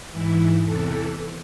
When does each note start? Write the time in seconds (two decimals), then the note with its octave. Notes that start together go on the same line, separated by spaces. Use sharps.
0.10 G#2 E3 E4
0.62 E2 C3 E3 A4